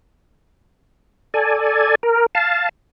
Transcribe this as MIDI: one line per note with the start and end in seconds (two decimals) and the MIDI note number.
1.34 1.95 69
1.34 1.95 74
1.34 1.95 80
2.03 2.26 70
2.35 2.69 77
2.35 2.69 81